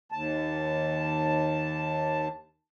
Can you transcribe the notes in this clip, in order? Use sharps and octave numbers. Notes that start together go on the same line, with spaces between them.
D#2 A5